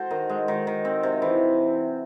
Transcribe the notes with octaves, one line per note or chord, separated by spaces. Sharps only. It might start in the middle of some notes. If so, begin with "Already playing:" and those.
Already playing: F#4 A4 C5
D#3
G#3
D#3
D#3
C4
C3
E3